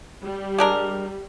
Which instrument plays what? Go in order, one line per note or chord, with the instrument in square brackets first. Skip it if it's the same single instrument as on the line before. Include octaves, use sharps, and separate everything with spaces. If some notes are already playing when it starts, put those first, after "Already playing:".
[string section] G3
[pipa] G#3 D4 A#4